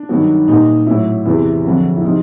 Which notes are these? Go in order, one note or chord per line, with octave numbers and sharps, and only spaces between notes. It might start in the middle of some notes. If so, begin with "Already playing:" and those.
Already playing: D4
G2 D#3 F#3
A#2 G3 D#4
A2 F#3 E4
E2 C3 E3
F2 D3 F#3
E4
C3 F3 D#4